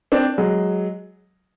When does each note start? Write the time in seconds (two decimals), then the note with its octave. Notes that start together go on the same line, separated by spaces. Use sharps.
0.12 C4 D4
0.38 F#3 G#3